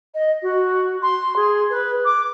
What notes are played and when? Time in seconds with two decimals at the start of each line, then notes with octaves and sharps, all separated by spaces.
0.15 D#5
0.42 F#4
1.02 C6
1.36 G#4
1.70 B4
2.05 D6